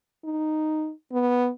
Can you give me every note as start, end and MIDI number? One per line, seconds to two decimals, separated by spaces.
0.24 0.92 63
1.12 1.49 59